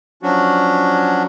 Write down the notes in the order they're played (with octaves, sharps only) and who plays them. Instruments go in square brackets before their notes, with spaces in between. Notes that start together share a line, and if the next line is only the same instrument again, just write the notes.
[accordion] F3 F#3 C#4 D4 F#4